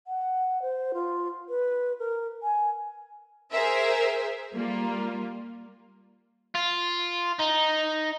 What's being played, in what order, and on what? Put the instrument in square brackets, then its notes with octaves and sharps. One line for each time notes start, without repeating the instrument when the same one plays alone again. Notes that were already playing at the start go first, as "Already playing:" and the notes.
[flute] F#5
C5
F4
B4
A#4
G#5
[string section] G#4 A#4 C5 E5
G3 A#3 F4
[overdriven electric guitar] F4
D#4